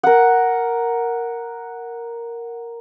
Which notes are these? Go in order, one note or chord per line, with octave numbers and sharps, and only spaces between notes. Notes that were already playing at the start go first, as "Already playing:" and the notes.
A#4 F#5